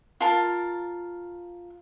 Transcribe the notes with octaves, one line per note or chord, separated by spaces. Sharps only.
F4 A#4 A5